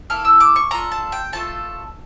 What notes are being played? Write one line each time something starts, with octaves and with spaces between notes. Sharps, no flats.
A#3 E4 A4 F6
E6
D6
C#6
D4 F4 A4 A#5
A5
G5
A3 C#4 F4 A4 A5